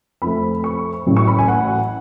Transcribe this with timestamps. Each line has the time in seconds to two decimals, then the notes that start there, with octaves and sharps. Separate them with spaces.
0.22 F2 F3 A3 B5
0.64 C#6
1.06 A1 A2 F#3
1.17 C#6
1.27 B5
1.38 G#5
1.48 F#5